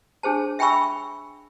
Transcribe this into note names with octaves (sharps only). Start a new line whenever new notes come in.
D4 G#4 C5 A5
E5 G5 G#5 B5 C#6 E6